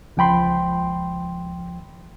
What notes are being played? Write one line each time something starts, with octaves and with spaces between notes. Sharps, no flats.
C#2 F3 G5 B5 C6